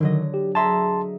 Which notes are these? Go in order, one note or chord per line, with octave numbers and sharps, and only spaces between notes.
D3 D#3 F#3 D#5
G4
G#4 E5 A5 A#5 C6